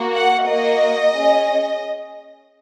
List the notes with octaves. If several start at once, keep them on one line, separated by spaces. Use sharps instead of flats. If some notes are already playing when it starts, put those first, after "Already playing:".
Already playing: A#3 F#4
F#5
A#3 F#4 D#5
C#4 G#4